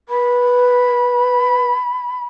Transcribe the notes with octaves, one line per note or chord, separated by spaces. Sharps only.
B4 B5